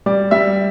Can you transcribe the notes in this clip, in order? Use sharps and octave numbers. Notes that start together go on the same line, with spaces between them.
G3 D5
G3 E5